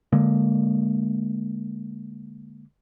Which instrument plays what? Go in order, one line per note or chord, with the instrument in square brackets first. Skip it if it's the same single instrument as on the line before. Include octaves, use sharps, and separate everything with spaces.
[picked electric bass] D3 G#3 A#3